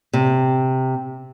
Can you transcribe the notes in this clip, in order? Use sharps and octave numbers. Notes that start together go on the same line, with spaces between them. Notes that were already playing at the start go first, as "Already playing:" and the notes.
C3